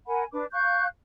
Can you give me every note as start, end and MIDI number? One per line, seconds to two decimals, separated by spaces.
0.07 0.24 70
0.07 0.24 78
0.07 0.24 80
0.07 0.24 83
0.32 0.45 62
0.32 0.45 71
0.32 0.45 86
0.52 0.85 77
0.52 0.85 85
0.52 0.85 90
0.52 0.85 91